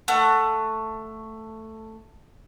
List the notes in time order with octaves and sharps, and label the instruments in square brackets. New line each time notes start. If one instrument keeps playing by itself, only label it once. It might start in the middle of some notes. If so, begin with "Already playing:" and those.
[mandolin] A3 F#5